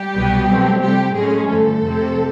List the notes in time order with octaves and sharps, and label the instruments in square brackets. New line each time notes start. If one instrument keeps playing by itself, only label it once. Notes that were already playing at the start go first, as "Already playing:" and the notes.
Already playing: [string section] G3 G4
C2 B2 F#3 B3
B2 F#3 A3 C4
C3 F3 G3 A3 G4
A2 F#3 G#3 A3 C#4 G#4
G2 D3 F3 A3 A4
F2 C3 F3 A3 C4